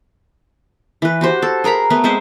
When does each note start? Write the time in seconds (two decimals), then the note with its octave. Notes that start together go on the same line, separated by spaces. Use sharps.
1.02 E3 B4
1.21 F#4 G4 C5
1.42 A4
1.64 G#4 A#4 A#5 B5
1.90 A3 B3 A#4 B4
2.04 G#3 C4 C5 E5